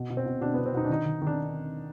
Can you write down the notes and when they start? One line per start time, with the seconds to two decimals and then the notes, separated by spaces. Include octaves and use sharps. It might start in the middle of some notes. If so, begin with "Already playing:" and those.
Already playing: B2
0.10 B2
0.17 C4
0.26 B2
0.41 B2 D4
0.54 B3
0.58 B2
0.66 C4
0.74 B2 D#4
0.85 D4
0.89 D#3 D#4
1.06 D#3
1.22 D#3
1.27 D4